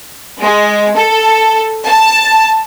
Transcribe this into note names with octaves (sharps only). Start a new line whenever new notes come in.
G#3
A4
A5